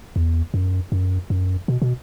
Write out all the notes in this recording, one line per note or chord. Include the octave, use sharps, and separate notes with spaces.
E2
F#2
F#2
F#2
B2
B2